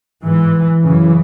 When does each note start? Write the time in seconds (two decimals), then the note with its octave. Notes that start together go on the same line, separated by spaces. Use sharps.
0.23 G#2 E3
0.83 F#2 C#3 E3